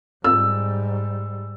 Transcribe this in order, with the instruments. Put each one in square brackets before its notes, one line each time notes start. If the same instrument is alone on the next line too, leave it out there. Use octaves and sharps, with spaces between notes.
[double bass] G#2 G3 [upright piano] E6